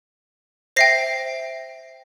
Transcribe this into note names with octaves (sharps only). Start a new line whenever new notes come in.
C5 E5 G5 A#6 C7